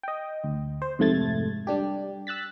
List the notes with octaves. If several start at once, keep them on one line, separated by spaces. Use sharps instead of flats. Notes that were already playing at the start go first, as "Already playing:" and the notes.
D#5 G5
D2
C5
F2 G#2 C3 A3 G#6 A6
G3 D4 G4
E6 F#6 A6 B6